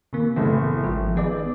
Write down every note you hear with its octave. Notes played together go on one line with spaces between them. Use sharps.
C3 D#3 A#3
F#1 A2 A3 B3
G#1 G#2 F3
D#3 B3 G#4 D5